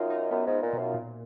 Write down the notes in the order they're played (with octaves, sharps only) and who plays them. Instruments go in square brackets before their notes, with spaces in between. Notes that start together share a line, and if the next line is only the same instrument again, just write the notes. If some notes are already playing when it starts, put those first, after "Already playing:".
Already playing: [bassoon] F#2 [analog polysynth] D#4 F4
[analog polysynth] D#4
[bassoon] F#2 [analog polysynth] B3
[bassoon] G#2
A#2
[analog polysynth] B2
[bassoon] F#2
[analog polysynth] A#2